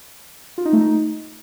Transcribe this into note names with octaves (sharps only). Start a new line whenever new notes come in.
F4
D#4
A3
D#4